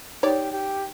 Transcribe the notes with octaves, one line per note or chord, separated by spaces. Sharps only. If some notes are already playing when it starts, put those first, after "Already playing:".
D#4 G4 C#5 D5
G4